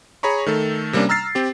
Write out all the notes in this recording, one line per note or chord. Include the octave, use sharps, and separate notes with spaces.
G#4 C#5 A#5 B5 C#6
D#3 A3 A4
C3 G3 A#3 C#4 D4
A#5 E6 F6 A6 C7
C4 G4